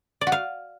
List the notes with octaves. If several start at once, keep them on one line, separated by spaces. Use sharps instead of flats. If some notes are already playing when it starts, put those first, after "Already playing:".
D5
F#4
F5